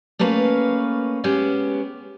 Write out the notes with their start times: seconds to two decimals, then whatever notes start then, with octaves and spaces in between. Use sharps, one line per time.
0.19 A3 A#3 C#4 B4 F5
1.24 G#3 B3 C#4 G4